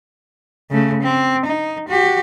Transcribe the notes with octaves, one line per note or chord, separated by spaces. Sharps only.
C#3 A3
C4
D#4
F#4 G4